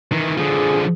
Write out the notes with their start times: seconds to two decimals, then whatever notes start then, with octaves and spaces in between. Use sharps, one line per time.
0.12 D#3 E3
0.37 D3 F3 G#4